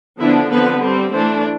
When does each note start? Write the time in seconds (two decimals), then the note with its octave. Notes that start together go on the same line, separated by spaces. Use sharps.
0.19 D3 F3 B3 D4 E4
0.50 D3 F3 B3 C4 B4
0.81 G3 C4
1.11 E3 A3 C4 D4 C5